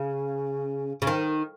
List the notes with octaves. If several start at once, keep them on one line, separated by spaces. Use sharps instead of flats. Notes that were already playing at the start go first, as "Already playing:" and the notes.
Already playing: C#3
C#3
D#3